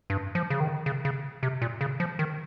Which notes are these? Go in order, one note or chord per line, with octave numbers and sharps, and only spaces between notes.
G2
F3
C#3
D#3
C#3
C#3
C3
A#2
C#3
F3
D#3